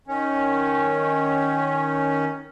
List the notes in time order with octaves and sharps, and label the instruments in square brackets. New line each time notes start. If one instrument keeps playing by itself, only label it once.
[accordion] D#3 C#4